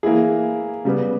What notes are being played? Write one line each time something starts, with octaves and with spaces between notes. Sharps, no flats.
E3 A#3 E4 G#4
C#3 G3 B3